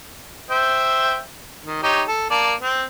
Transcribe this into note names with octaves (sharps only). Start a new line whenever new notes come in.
C5 E5 G5
D#3
D#4 G4 C#5
A4
A#3 D5 A5
C4